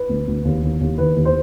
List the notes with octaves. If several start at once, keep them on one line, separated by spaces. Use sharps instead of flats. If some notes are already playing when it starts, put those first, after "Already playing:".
Already playing: B4
D2
D2
D#2
D#2
D#2
D#3 B4
D#2
C5